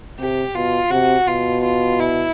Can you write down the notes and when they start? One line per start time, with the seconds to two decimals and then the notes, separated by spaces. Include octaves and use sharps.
0.19 C3 G4
0.55 B2 F4
0.91 C3 F#4
1.27 B2 F4
1.63 F4
1.99 E4